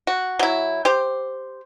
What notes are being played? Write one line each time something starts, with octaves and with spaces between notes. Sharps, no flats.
F#4
F#3 E4
G4 C5